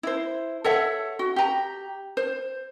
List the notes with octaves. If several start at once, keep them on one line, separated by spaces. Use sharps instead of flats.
E4 C5
A4 C#5 E5 F#5
F#4
G4 A#5
C5